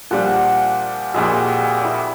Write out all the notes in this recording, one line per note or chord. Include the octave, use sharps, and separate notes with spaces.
A#2 F3 G3 D4 F#5
A#1 F2 A#2 G3 G#3 F#4
E4 D5